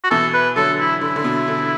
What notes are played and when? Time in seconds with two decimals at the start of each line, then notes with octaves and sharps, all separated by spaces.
0.04 F#4
0.11 B2 E3 A4
0.34 B4
0.56 D3 F#3 A4
0.80 E4
1.01 D3 E4
1.16 D3
1.24 B2
1.48 D3